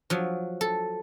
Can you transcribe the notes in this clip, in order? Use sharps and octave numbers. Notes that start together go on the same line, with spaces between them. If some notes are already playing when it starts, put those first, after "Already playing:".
F3 F#3
A4